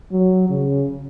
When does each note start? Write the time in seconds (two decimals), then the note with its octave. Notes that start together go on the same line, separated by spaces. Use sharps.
0.12 F#3
0.49 C#3